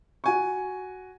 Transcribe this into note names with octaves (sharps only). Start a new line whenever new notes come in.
F#4 G#5 C#6